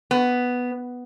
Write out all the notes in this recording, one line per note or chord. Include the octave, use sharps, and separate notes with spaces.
B3